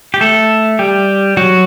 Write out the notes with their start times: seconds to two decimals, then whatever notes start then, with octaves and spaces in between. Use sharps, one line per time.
0.14 G4
0.21 A3 A4
0.79 G3 G4
1.37 F#3 F#4